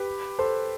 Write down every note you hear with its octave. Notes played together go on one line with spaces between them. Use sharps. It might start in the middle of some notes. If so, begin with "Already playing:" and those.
Already playing: G4 B4
A4 C5